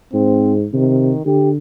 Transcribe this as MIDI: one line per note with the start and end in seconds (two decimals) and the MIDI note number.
0.14 0.65 44
0.14 0.53 60
0.73 1.12 48
0.73 1.22 51
1.26 1.57 50
1.26 1.50 67